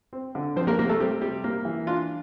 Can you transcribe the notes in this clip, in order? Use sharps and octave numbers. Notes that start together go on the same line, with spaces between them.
C4
D3
F3 C4 C5
A#3 A#4
C3 A#3 A#4
A3 A4
G3 C4 G4
C3 G3 G4
A#3
E3
D4 F4